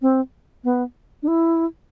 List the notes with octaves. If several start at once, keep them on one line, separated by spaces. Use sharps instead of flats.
C4
B3
D4
E4